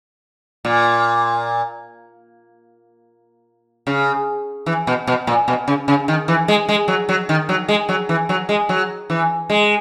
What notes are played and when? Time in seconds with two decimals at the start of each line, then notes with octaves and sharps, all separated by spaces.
0.65 A#2
3.87 C#3
4.66 E3
4.87 B2
5.07 B2
5.27 A#2
5.48 B2
5.68 C#3
5.88 C#3
6.08 D#3
6.28 E3
6.48 G#3
6.69 G#3
6.88 F#3
7.09 F#3
7.29 D#3
7.49 F#3
7.68 G#3
7.89 F#3
8.09 E3
8.29 F#3
8.49 G#3
8.69 F#3
9.10 E3
9.50 G#3